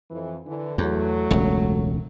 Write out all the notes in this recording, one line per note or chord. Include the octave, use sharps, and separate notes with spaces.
F2 E3
D3 E3
E2 F#3 A3
E1 C#2